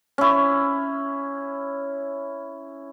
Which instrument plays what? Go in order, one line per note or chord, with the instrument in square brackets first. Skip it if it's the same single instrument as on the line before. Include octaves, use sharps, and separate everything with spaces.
[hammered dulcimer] C#4 E4